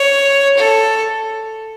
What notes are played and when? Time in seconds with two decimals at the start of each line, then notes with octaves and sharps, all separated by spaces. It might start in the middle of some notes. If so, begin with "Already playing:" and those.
Already playing: C#5
0.57 A4